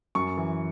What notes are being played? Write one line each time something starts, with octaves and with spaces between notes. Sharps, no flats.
F#2 C#6
E3